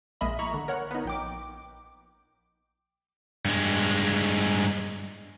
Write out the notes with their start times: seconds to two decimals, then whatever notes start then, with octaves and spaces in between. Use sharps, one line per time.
0.21 A#1 G#3 A#3 D#5 E5 B5
0.39 E4 A#5 B5 C#6
0.54 D3
0.68 A#4 C#5 F#5
0.91 B3 D#4
1.05 A#1 G5 D6
3.45 G2 G#3